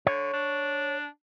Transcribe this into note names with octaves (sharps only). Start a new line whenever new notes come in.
D3 C#5
D4